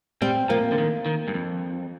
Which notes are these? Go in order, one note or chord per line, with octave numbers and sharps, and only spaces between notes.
G3 C4
F3 A#3
D3
D#3
D#3
G2
F2